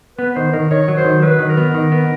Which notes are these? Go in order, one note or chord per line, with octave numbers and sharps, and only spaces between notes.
B3 B4
D#3 C5
D#3 A#4
D#3 C#5
F#3
C5
D#3
F#3 B4
D#3
A#4
B3
D#3
B3